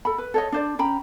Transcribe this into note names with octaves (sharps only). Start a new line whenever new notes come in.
A4 B5
B4
A4 C#5 D#5
D4 C5 D5
C#4 G5 A#5 B5